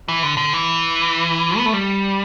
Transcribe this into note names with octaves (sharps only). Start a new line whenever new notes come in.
E3
D3
D3
E3
B3
A3
G3